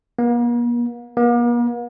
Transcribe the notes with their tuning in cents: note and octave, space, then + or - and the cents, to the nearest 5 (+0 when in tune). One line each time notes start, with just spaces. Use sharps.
A#3 +45
A#3 +45